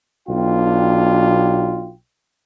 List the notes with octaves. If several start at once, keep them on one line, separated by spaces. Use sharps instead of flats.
B1 B2 D4 F4 G5